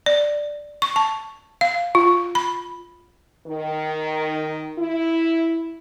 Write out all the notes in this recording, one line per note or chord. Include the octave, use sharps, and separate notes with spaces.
D5
C#6
A5
F5
F4
B5
D#3
E4